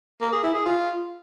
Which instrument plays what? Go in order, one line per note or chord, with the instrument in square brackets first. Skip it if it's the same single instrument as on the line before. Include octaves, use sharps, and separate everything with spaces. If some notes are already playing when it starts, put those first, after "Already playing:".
[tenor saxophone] A#3
G#4
E4
G#4
F4